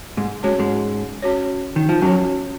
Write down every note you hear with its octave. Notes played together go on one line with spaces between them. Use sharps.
G#2 G#3
G#3 C#4 F#4 C#5
G#2 G#3
C#4 F#4 C#5
D#3
F3
F#2 F#3 C#4 F#4 C#5